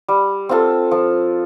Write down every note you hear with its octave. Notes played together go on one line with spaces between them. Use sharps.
G3
C4 F4 A4
F3